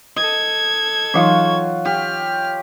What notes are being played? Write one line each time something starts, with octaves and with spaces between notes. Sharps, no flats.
A4 D#5 G#6
E3 F#3 D#4 F4 F#4 C#5
G4 F6